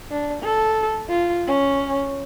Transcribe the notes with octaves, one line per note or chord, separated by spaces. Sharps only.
D4
A4
F4
C#4